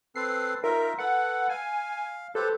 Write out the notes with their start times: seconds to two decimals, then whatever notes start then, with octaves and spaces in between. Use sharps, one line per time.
0.16 C4 A4 B4 C7
0.64 D#4 F4 A#4 E5
0.99 A4 B4 F#5
1.50 F5 G#5
2.35 G4 A4 B4 C5